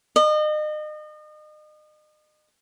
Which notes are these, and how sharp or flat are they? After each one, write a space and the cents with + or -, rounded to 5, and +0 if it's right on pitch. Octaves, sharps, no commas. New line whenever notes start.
D#5 -35